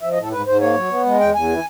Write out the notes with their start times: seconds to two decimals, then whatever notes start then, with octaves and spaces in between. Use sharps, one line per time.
0.02 F3 E5
0.12 D#5
0.17 A2 A4
0.32 G#2 B4
0.46 G#2 C5
0.61 A#3 C#5
0.75 F#3
0.90 B3
1.05 G#3
1.20 E2 G5
1.34 E2 G#5
1.49 E3